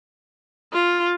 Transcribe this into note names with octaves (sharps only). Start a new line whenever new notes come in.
F4